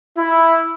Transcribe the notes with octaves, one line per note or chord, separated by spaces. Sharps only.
E4